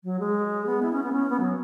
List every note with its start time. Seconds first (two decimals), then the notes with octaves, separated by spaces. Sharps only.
0.04 F#3
0.20 G#3
0.66 B3
0.82 E4
0.93 C#4
1.03 B3
1.12 C#4
1.30 B3
1.40 F#3